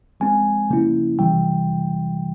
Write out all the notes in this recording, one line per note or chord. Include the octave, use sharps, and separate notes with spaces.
F3 G#3 C4 G#5
C#3 F3 A#3 C#4 E4
C3 E3 G3 G5